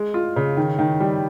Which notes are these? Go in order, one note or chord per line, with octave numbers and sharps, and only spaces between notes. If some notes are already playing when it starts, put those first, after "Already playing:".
Already playing: G#3
F4
C#3
D#3
D#3
G3